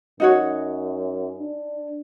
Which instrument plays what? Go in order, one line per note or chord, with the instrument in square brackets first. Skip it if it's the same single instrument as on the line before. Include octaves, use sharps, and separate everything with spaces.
[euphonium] F#2 [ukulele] D#4 F#4 C#5
[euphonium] D4